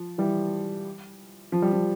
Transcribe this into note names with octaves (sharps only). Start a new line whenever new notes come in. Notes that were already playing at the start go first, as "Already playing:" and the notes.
Already playing: F3
E3 G3
F3
G3
F3